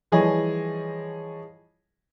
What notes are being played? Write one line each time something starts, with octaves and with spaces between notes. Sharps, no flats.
E3 F3 G3 G#4 C#5 D#5